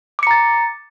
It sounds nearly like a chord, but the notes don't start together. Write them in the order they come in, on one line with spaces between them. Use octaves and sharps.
D6 C#7 A#5 A6